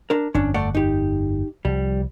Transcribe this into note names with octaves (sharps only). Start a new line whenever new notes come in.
D4 A#4
G1 F2 C#4 D4
A3 D5 F#5
D#4 G4
C2 F3 G3